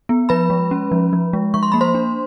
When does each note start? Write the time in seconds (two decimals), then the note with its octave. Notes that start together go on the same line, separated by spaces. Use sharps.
0.09 B3
0.29 F3 B4 B5
0.50 G#3
0.71 C#4
0.92 F3
1.13 F3
1.33 G#3
1.54 F3 C#6
1.63 C6
1.72 A#3 B5
1.81 C5 C6
1.95 D4